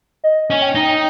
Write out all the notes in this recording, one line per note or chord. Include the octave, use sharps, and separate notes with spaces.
D#5
C#4
G5
D#4